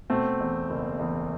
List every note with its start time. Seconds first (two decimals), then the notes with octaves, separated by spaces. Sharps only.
0.10 B2 A3 C4
0.40 E2
0.70 F#1
0.99 E2